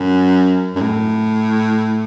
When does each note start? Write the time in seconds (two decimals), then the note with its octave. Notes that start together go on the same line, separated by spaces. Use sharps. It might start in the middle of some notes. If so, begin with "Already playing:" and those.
Already playing: F#2
0.75 F#2
0.81 A2